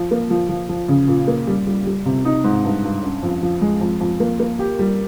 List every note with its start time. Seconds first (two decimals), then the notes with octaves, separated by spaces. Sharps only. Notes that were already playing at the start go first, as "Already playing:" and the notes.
Already playing: F3
0.11 A#3
0.30 F3
0.49 F3
0.69 F3
0.88 C#3
1.08 A#2
1.28 A#3
1.47 G3
1.67 G3
1.87 G3
2.06 C3
2.25 D#4
2.44 G#2
2.64 G2
2.84 G2
3.03 C#4
3.23 F2
3.43 F3
3.61 G#3
3.81 F2
4.01 F2
4.20 A#3
4.40 A#3
4.59 G4
4.79 G3